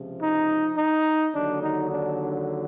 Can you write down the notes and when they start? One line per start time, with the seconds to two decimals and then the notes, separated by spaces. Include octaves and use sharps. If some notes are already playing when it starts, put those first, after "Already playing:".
Already playing: C#2 C3 F3
0.20 D#4
0.76 D#4
1.33 D#2 D3 F#3 D4
1.61 D#4
1.89 D4